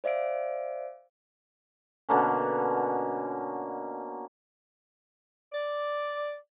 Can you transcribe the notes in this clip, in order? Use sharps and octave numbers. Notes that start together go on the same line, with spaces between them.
C5 D5 E5 F5 D7
B2 D3 A#3 C#4
D5